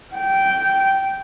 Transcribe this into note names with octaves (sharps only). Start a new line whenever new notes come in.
G5